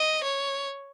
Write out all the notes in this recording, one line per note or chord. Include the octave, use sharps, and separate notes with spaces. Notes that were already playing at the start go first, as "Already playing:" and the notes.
Already playing: D#5
C#5